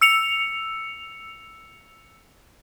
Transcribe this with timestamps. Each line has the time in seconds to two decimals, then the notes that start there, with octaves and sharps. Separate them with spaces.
0.01 E6 C#7 F7